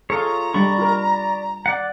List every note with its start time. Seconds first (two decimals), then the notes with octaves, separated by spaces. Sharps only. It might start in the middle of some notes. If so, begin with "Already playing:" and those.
0.10 F4 G#4 A4 C#5 A#5
0.54 G3 D4 D5 B5 C#6
0.78 F4 A#4
1.66 D5 F#5